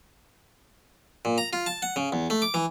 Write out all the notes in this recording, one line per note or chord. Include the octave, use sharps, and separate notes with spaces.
A#2
A#5
F4
A5
F#5
C#3
E2
A3
D6
E3